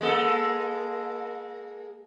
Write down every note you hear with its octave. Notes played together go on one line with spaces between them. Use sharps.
G#3 A#3 A4